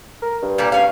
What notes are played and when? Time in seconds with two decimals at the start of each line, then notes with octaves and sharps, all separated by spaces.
0.22 A#4
0.42 G2
0.58 A#2 G3 G4
0.72 G2 C#4 F5